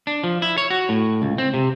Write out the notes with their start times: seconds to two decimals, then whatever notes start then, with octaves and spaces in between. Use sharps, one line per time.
0.07 D4
0.24 F3
0.42 E4
0.58 C#5
0.70 F#4
0.89 A2
1.22 C#2
1.38 C4
1.54 C3